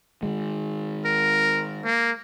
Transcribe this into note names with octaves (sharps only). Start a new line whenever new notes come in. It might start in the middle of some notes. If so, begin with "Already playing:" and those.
D#3 G#3
A#4
A#3